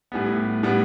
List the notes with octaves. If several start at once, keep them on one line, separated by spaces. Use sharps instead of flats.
A2 G3 B3
A2 G3 B3